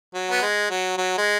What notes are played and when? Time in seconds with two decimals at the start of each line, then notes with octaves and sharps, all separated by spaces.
0.14 F#3
0.30 B3
0.42 G#3
0.70 F#3
0.97 F#3
1.18 G#3